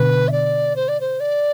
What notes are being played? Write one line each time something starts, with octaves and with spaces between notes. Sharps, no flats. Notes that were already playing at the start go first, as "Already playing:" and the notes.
Already playing: B2 D3 B4
E5
D5
C5
D5
C5
D5